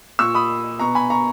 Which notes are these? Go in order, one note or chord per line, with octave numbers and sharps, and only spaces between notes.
A#2 C#6 E6
B5 D#6
B2 A#5 C#6
G#5 B5
A#5 C#6